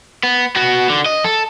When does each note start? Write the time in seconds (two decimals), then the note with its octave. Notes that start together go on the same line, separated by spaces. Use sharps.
0.23 B3
0.56 B3 F#4
0.89 D3
1.06 D#5
1.24 A4